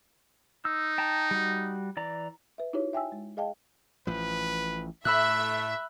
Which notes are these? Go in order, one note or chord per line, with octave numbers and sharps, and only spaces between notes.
D#4 E6
G5 A5 A#5
G3 F#4
E3 D5 A#5
B4 E5
D#4 E4 F#4 G4 C#5
E5 G5 G#5 E6
G#3
G#4 D#5 F5 G5 A5
A1 F3 B4
A2 A3 E5 B5 E6 F#6